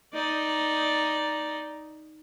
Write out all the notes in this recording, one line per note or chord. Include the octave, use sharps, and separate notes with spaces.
D#4 D5